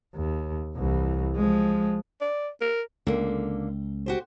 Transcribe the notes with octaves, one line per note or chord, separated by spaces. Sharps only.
D#2
C2 E3
F3 G#3
D5
A#4
C#2 D3 A#3
F#4 G4 C5